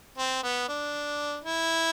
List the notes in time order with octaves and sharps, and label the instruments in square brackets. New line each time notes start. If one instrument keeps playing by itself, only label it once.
[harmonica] C4
B3
D4
E4